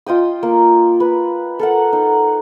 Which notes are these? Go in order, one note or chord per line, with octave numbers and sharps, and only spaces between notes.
F4 D#5 G5 D#6
A#3
B4
A4 A#4 F#5
D#4